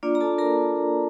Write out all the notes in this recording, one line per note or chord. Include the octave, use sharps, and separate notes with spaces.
A#3 D4 F4 D5
A#5
A4 A5
A#4 A#5